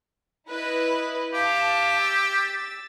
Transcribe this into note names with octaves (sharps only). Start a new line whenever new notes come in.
E4 B4 D#5
G4 F5 A5
E6 A6